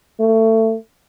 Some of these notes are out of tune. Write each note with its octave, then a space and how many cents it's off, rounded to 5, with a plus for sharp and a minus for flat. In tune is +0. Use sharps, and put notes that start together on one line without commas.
A3 +25